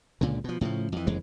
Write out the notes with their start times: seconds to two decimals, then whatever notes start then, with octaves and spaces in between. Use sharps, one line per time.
0.21 C#2 A#2 D3
0.44 B2 F3
0.61 A2 C#3 E3 F3
0.92 F2 E3
1.07 F#1 F2 E3 G#3